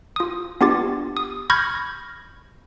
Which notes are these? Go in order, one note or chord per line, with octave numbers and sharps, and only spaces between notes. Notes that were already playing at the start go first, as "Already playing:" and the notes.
F4 D#6
B3 D4 F4 G4 A6
D#6
B5 C#6 F6 G6 G#6 A#6